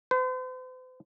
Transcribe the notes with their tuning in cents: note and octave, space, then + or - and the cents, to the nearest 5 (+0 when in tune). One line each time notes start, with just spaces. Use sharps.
C5 -45